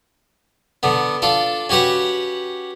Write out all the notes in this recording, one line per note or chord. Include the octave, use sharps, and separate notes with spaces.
D3 B3
D4 F4 A4
C#4 F#4 G4 B4 F#5